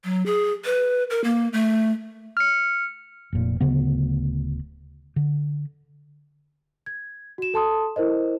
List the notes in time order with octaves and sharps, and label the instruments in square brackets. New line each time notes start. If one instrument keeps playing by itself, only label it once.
[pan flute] F#3
G#4
B4
A#4
A#3
A3
[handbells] F6 C#7
[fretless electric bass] F1 A#2
D1 D2 C#3 B3
D3
[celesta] G#6
F#4 E7
A4 A5 C6 D#6
E4 A#4 C5 D#5